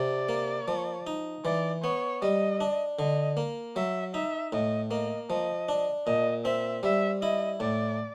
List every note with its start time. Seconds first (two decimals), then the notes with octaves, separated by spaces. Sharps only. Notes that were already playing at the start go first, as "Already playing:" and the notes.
Already playing: C3 D5
0.29 A#3
0.68 F3
1.07 D#4
1.45 E3 D5
1.83 B3 C#5
2.22 G3 D#5
2.61 D4
2.98 D3 D#5
3.37 A#3
3.76 F#3 E5
4.14 D#4 E5
4.53 A2 D#5
4.91 A#3 D#5
5.30 F3 D#5
5.69 D4
6.06 A#2 D#5
6.45 C4 E5
6.83 G3 E5
7.22 E4 D#5
7.60 A2 D5